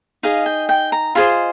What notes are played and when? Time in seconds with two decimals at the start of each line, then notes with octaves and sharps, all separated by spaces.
0.23 D#4 G#4 D#5 F5
0.46 G5
0.69 G5
0.92 A#5
1.15 F4 G#4 C5 D#5 C6